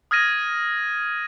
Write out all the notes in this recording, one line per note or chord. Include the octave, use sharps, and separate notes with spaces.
D#6 F6 G#6 A#6 D#7